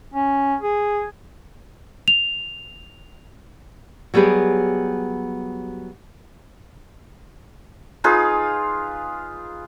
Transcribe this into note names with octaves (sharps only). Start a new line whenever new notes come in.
C#4
G#4
F7
F#3 G3 B3 G4 G#4
D#4 F4 G#4 B4